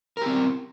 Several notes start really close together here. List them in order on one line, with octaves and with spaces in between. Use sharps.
A#4 G4 C4